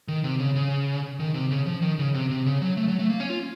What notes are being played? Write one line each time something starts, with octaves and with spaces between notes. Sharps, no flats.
D#3
C3
C#3
C#3
D#3
C3
C#3
F3
D#3
C#3
C3
C3
C#3
F#3
A3
F#3
A3
A#3
C#4
F4